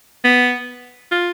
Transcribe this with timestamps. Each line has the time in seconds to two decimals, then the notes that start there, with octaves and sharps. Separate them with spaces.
0.24 B3
1.12 F4